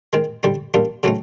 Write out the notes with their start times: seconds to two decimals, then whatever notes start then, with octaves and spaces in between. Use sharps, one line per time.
0.13 D#3 G#3 C4
0.43 D3 G3 C4 D#4
0.74 G3 A#3 D4 F4
1.03 C#3 F#3 A3 C4 D#4